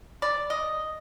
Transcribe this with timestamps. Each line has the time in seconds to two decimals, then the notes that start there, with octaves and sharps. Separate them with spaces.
0.22 D5
0.50 D#5